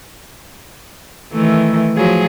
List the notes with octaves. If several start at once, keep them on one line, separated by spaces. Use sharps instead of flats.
D#3 E3 A3
F3 F#3 G#4